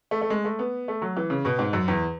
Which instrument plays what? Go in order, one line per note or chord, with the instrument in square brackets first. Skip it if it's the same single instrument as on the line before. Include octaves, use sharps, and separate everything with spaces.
[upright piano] A3
A3
G#3
A3
B3
A3
F#3
E3
C#3
B2
G#2
F#2
E2